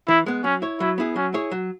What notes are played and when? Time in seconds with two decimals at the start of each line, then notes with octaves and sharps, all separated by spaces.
0.08 E3 E4
0.26 G#3 B3
0.44 F#3 C#4
0.62 E4 C#5
0.80 F#3 E4
0.98 B3 E4 G#4
1.16 F#3 C#4
1.34 E4 G#4 C#5
1.51 F#3